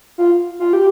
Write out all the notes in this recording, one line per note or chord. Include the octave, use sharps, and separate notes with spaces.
F4
F4
G4